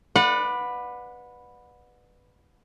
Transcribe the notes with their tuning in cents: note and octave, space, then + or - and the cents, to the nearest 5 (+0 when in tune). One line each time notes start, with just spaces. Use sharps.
B4 +0 D5 +25 F#5 -25